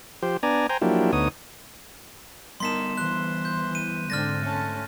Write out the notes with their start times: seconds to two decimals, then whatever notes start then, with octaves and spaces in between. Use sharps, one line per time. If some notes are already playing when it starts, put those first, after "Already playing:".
0.23 F3 G4 C5
0.43 B3 D4 D5 G#5 A#5
0.69 C5 G5 G#5 A#5
0.82 F3 F#3 A#3 D4 E4 G4
1.13 D2 B3 D#4 C#5 D#6
2.60 G3 B3 D#4 A#4 A5 C6 B6 E7
2.98 E3 C5 C6 F#6
3.45 G6
3.75 D#7
4.10 G#2 D3 C4 D4 F6 A6 A#6
4.43 A3 C#4 A5